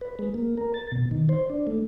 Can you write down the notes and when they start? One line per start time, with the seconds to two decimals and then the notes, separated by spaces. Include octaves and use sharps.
0.01 B4
0.19 G#3
0.34 A#3
0.57 A#4
0.74 A6
0.92 B2
1.11 D#3
1.29 C5
1.50 D4
1.67 A3